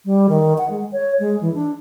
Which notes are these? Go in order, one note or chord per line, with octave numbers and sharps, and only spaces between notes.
G3
D#3
F#5
G#3
C#5
G#3
E3
D4